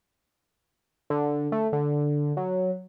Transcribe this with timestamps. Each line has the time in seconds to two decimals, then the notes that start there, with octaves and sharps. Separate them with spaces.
1.10 D3
1.52 A3
1.73 D3
2.37 F#3